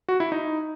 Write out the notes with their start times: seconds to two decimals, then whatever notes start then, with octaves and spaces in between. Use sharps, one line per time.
0.09 F#4
0.20 E4
0.32 D#4